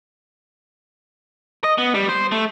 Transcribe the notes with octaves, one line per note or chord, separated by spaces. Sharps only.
D#5
B3
G3
C5
A3